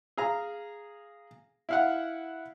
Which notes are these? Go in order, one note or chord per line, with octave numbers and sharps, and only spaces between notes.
G#4 F5 A#5
E4 F5 F#5